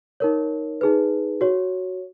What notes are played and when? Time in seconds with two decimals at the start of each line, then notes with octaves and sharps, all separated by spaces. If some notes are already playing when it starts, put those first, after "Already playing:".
0.20 D#4 A#4 C#5
0.81 D#4 G#4 B4
1.41 F#4 C#5